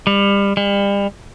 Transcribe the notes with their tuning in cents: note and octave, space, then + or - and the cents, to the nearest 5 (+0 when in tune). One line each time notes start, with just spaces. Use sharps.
G3 +30
G3 +40